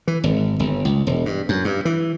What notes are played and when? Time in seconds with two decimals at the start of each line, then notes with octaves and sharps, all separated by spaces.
0.07 E3
0.24 G#1
0.59 G1
0.85 C#2
1.07 E1
1.26 G2
1.49 F#2
1.64 G2
1.85 E3